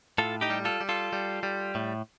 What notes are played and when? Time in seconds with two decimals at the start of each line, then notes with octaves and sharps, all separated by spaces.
0.18 A2 F4 A4
0.41 D#4 G4
0.50 G3
0.65 F4 A4
0.81 G3
0.89 F4 A4
1.13 G3
1.43 G3
1.75 A2